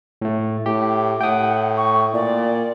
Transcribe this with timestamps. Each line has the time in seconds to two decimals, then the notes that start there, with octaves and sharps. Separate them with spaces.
0.22 A2 A3
0.66 A2 G4
1.21 A2 F#5 G5 D#6
1.77 C#6
2.14 A#2 D5